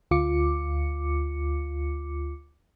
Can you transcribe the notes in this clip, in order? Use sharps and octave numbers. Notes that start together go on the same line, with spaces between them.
D2 F4 D6 C#7